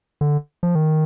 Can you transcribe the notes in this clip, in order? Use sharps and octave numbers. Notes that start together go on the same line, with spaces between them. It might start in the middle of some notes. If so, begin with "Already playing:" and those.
D3
F3
D#3